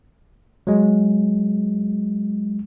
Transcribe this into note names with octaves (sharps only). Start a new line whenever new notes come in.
F#3 G#3